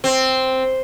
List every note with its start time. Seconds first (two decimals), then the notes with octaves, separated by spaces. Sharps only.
0.04 C4